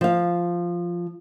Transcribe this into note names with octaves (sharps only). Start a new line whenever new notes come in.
F3 F5